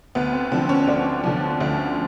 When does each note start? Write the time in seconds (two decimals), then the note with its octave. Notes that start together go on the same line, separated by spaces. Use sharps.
0.15 D2 B3
0.33 C4
0.51 D3 F3 C4
0.69 C#4
0.87 D2 D4
1.24 D3 F3
1.60 D2